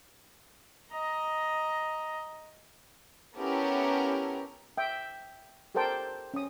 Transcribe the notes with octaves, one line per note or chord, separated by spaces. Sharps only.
D#5 A#5
B3 C#4 E4 G4 A4 A#4
E5 G5
G4 A4 A#4 C5 G5 A5
C#4 D#6